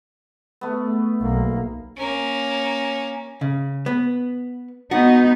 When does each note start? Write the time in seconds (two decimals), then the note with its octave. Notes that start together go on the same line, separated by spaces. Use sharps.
0.61 A3 B3
1.21 B1 A#3
1.97 A#3 C#4
3.41 C#3
3.86 B3
4.91 B3 D#4 F#4